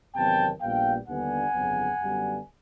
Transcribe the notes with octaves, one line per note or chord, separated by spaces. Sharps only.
E2 C3 D#3 F#3 B3 G5 A5
A#1 A#2 G3 B3 F5 G5
D#2 D3 G3 B3 D4 F#5 G#5
G1 F2 C#3 F#3 B3
F#2 D3 G3 B3